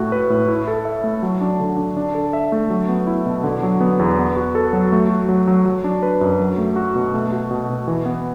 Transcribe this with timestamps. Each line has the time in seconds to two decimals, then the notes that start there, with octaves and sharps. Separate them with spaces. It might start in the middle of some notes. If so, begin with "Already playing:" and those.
Already playing: A2 A3 F#4
0.12 B4
0.30 A2
0.48 E4
0.68 A4
0.85 E5
1.04 A3
1.23 F#3
1.41 D4
1.60 D3
1.78 D3
1.97 D4
2.14 A4
2.33 E5
2.52 A3
2.70 F#3
2.89 B3
3.07 E4
3.26 B2
3.44 D3
3.63 F#3
3.81 B3
3.99 E2
4.19 B3
4.37 F#4
4.55 A4
4.73 F#3
4.92 A3
5.10 F#4
5.29 F#3
5.48 F#3
5.66 F#3
5.84 D4
6.03 B4
6.21 F#2
6.40 F#3
6.58 A3
6.76 F#4
6.96 B2
7.14 A3
7.32 F#4
7.51 B2
7.69 B2
7.88 E3
8.06 B3